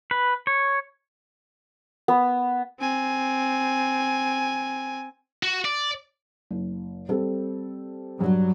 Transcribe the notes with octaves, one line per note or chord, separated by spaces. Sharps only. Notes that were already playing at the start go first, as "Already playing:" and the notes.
B4
C#5
B3
C4 G#5
F#4
D5
F#1
G3 C4 A4
G2 F#3